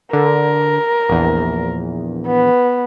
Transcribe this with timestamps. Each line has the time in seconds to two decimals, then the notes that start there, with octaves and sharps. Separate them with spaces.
0.13 D3 A#4
1.09 A#1 E2
2.27 B3